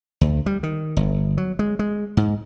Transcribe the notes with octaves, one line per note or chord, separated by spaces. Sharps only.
D2
G3
D#3
G1
F#3
G#3
G#3
G#2